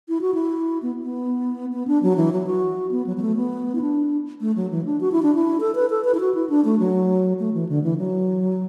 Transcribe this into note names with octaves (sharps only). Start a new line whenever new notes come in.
E4
F#4
E4
B3
B3
B3
D4
F#3
E3
F#3
F#4
B3
F#3
F#3
A3
B3
E4
D4
A3
F#3
E3
D4
F#4
E4
D4
E4
A4
B4
A4
B4
E4
F#4
E4
D4
A3
F#3
A3
E3
D3
E3
F#3